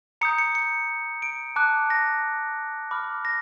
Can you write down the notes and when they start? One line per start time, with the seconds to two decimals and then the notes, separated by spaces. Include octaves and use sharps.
0.21 A#5 D#6 G6 C#7
0.38 C#7
0.55 C#7
1.22 D7
1.56 A5 D6 F#6
1.90 A#6
2.91 B5 D6 F6
3.25 A#6